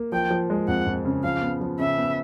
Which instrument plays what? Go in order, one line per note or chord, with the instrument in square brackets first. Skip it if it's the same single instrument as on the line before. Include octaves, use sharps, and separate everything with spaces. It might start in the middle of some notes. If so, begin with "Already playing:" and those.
Already playing: [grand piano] A#3
[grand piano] F3 [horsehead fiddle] G5
[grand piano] F3
G#3
[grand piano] F2 [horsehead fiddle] F#5
[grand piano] F2
C#3
[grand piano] F3 [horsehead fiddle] F5
[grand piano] B3
F3
[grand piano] C#3 [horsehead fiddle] E5
[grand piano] B3